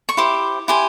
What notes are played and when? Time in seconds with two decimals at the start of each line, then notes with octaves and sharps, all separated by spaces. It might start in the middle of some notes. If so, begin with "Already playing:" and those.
0.09 C#6
0.17 E4 G4 C5 D6
0.68 E4 G4 C5 G#5